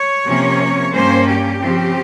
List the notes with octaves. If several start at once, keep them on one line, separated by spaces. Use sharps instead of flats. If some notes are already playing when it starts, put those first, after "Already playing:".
Already playing: C#5
C3 F3 A#3 C#4
G2 G3 A#3 C#4 C5
G4
C#3 F3 C4